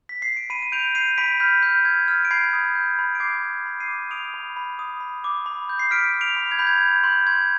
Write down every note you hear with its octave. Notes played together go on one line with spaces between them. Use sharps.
B6
C7
D7
B5 C7 D#7
D#7
G6 D7 F7
G6 C7 D#7
B5 B6 D7
F6 G6 B6
F6 G6
F6 G#6
F6
D7
B5 G#6 C7
D#6
G6
B5
D7
D6 G#6 C7
B5
B5
C7 D#7
D6
D#6 D7 F7
B5
B5
D#6
B5
D6
B5
G6
C7
F6 B6 D7
F6
D7 F7
B5
G#6
B5 G6
G#6
G6
C6 G6
C6 G#6